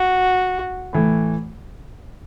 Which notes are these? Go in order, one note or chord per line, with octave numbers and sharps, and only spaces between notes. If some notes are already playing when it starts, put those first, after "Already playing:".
Already playing: F#4
A2 E3 A3